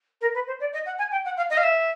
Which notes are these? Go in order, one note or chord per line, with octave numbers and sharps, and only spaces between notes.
A#4
B4
C5
D5
D#5
F#5
G#5
G5
F#5
F5
D#5
F5
E5